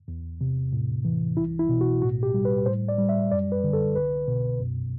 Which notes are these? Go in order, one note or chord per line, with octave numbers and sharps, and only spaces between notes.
E2
C3
A2
E3
C2 E4
E4
B2
F#4
A2 F#4
G4
G3
B4
A2 C5
D5
G3
E5
F#2 D5
B4
D3
A4
C2 B4
B2
F#2